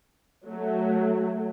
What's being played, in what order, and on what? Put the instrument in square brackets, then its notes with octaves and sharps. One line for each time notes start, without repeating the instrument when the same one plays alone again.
[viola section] F#3 A3